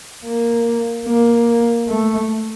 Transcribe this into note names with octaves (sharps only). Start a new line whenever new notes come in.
A#3
A#3
A3